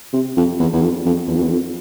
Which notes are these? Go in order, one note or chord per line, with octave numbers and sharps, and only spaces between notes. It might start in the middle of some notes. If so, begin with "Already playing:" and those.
C3
F2
E2
E2
F2
F2
E2
F2
E2
F2